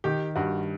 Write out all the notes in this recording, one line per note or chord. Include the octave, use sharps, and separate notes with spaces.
D#3 G4
G2 F#4